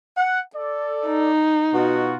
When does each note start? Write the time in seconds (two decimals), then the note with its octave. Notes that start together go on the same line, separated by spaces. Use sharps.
0.17 F#5
0.55 A4 D5
1.07 D#4
1.74 B2 F4 F#4